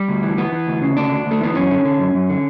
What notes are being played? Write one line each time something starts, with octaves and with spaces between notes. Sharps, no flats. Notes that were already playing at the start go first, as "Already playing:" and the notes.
Already playing: G3
D2
E3
E3 B3
E3
D2
C#3
D2 D4
D2
D2
A3
E3 B3
F#2 C#4
D3
D3
F#2
F#2
D3